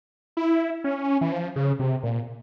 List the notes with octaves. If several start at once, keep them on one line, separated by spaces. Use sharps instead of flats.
E4
C#4
E3
F3
C#3
C3
A#2